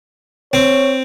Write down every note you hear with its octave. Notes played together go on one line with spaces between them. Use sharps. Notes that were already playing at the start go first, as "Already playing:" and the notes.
C4 C#5